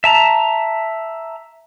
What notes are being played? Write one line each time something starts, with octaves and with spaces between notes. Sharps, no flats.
E5 A5 A#5